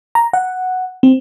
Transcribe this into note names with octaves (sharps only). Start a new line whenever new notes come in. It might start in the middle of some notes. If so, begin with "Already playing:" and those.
A#5
F#5
C4